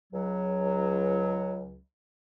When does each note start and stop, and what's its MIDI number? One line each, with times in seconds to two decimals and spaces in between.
0.13 1.78 37
0.13 1.78 54